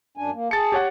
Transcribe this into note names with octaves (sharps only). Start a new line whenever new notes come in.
F#2 D4 G#5
A#3
G#4 A5 A6 C#7
G4 C#5 F#5